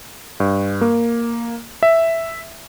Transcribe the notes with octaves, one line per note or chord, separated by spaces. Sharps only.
G2
A#3
E5